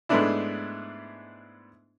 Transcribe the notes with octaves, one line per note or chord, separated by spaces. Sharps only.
G#2 G#3 A3 B3 D4 E4